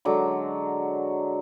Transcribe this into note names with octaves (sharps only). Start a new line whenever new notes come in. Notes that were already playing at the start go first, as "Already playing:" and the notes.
D3 F#3 G#3 D6